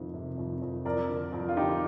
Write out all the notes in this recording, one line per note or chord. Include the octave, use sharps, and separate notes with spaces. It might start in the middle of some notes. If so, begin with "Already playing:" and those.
Already playing: F2 C3 D#3
C3
F2
F2
F2 A#4 D5
D3
F2
F4
D3 D#4 G4